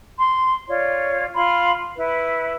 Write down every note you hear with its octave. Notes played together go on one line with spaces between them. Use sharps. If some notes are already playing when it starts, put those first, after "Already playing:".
C6
F4 C#5 D5
F4 B5 C6
E4 B4